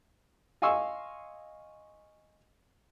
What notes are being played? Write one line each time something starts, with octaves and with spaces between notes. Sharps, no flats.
D#5 F5 G#5 C6 C#6 E6